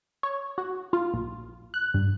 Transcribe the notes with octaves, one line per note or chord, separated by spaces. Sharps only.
C#5
F#4
F4
A#1
F#6
G2